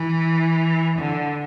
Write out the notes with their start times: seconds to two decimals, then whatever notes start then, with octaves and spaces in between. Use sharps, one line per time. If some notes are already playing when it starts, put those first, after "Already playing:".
Already playing: E3
0.99 D3